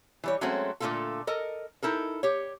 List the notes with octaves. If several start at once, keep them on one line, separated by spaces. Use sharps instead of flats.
E3 G3 C#5
F#3 G#3 A3 C4 C#4 F#4
A#2 D3 G#3 A3 F4 A4
A4 A#4 D#5
D#4 E4 A4 A#4
G4 C#5